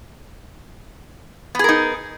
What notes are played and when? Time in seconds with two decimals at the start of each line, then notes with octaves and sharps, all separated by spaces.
1.55 B3
1.59 G#4
1.64 A#4
1.69 D#4